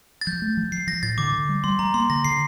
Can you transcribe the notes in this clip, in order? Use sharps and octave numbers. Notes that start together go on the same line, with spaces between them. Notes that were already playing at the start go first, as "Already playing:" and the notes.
A6
F3 G6
A3
F3
F3 C7
F3 A#6
A2 A6
D3 D6
D3
G3
G3 C6
G3 A#5
A#3 C6
D3 A#6
D3 C7